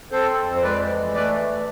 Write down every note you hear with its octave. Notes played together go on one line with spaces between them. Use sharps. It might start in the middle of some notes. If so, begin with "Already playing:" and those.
C4 A4 C5
F2
C5
G#3 B4 D5
E3
A3 B4 D5
E2